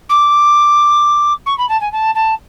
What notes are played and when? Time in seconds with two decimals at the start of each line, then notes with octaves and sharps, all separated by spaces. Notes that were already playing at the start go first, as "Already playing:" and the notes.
0.09 D6
1.46 C#6
1.58 B5
1.69 A5
1.81 G#5
1.92 A5
2.15 A5